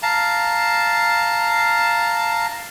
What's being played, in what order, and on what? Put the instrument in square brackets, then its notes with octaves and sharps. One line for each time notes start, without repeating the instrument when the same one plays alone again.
[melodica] F5 A5 A#5